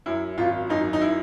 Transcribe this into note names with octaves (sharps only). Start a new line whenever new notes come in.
F#2 E4
G#1 F4
F#2 D#4
D#4
E4